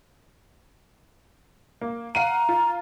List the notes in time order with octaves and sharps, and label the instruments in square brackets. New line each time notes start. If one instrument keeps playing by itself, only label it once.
[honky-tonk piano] A#3
[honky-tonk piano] F5 F#5 D#7 [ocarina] A#5
[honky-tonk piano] F4